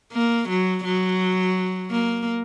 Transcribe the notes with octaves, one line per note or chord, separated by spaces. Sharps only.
A#3
F#3
F#3
A#3